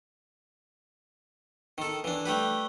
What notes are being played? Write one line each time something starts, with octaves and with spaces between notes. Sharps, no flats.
D#3 A4
E3 D4
G3 A3 G4 B4